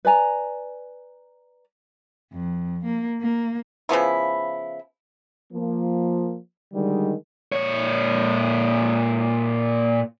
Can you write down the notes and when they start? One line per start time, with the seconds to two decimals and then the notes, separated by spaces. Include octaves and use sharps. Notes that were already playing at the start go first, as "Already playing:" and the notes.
0.05 B4 D5 G#5 A#5
2.33 F2
2.85 A#3
3.21 A#3
3.89 C#3 F3 B3 E4
5.53 F3 A#3
6.74 D3 D#3 G3 G#3
7.52 A#2 C#5